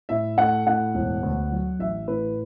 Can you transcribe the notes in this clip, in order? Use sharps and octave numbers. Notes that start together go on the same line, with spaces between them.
A2 E5
A3 F#5
A2 F#5
E1
D2
F#3
A1 E5
A2 B4